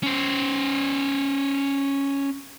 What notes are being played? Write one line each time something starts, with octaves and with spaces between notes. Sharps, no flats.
C#4 C5